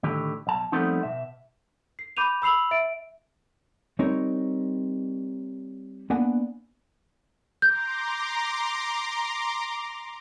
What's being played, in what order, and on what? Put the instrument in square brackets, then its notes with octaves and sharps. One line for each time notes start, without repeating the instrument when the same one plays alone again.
[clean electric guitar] A2 D3 D#3 G4
B1 A5
F3 G3 A3 B3 C4 D#4
B2 E5
[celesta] C7
B5 D6 G6 D#7 F7
B5 E6 C7 F7 F#7
E5 D7
[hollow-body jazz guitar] G3 C4 D#4 A#4 C#5
A#3 B3 D4 F#5 G#5
[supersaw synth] A#5 C6 D6 [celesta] G6